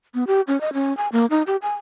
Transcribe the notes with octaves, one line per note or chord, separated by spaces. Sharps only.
B3
G4
C#4
D#5
C#4
G#5
A#3
D#4
G4
G#5